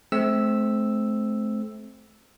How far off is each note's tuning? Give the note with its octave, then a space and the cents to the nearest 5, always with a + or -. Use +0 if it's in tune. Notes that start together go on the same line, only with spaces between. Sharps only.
A3 -35 C4 +0 E6 +0